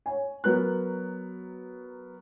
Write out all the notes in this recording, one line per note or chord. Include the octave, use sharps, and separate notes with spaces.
C#5 G#5
F#3 B3 A#4 F#6